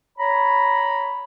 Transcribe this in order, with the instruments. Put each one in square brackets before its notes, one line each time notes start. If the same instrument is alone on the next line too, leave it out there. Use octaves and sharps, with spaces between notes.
[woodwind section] C#5 A#5 B5